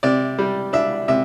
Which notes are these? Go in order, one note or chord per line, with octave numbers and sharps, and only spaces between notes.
C3 D5
G3
D4 E5
C3 E5